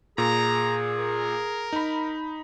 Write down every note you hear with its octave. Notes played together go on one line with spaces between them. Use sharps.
A#2 G#4 A#5
A#4
D#4 B5